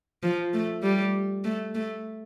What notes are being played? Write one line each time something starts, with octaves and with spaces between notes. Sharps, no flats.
F3
A3
G3
A3
A3